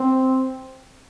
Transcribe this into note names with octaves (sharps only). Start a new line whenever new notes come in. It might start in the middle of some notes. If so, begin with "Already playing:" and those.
Already playing: C4